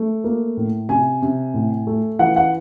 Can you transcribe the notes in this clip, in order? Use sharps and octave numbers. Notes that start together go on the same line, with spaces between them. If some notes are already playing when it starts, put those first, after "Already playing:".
Already playing: A3
A#3
A2
C3 G#5
C3
A2
A3
E3 F#5
F#5